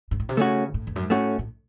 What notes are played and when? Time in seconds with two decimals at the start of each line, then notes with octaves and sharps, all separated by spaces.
0.11 G#2
0.20 A2
0.29 C3
0.37 C#3 A3 C#4 F#4
0.74 A2
0.87 E2
0.96 F#2
1.03 G#2
1.10 A2 A3 C#4 F#4
1.39 A2